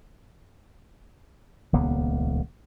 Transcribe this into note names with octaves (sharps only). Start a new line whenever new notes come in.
D#1 C#2 A#3 B3